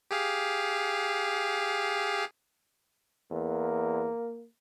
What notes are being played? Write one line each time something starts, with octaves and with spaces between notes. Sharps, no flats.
G4 G#4 F5
E2 A#3